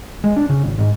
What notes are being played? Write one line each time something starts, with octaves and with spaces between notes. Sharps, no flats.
G#3
D4
C#3
G#1
G#2